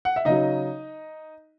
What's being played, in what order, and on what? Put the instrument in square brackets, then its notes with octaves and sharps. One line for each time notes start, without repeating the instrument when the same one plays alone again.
[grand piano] F#5
E5
C#3 F#3 D#4 D#5